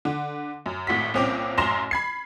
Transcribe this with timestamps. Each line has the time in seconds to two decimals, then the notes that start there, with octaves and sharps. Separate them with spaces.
0.05 D3
0.66 F#2
0.87 G#1 A2 F#4 B6
1.14 C2 A#2 C4 C#4 G5 D6
1.58 A1 F#2 A#5 C6 A#6 E7
1.91 B5 G#6 C7